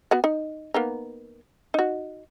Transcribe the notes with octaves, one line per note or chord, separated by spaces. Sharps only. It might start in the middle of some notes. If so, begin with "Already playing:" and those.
B3 F#4 F#5
D#4
A#3 B3 D#4
D#4 F#4